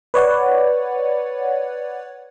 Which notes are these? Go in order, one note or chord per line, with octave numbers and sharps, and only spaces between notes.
B4 C#5 D5 F#5